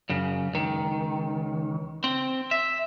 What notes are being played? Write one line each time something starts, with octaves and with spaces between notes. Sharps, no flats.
F#2 C#3
C#2 D#3
C4
E5